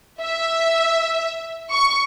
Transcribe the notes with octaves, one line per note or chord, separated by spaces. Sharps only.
E5
C#6